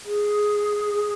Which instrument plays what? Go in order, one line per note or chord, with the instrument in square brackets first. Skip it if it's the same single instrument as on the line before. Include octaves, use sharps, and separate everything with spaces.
[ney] G#4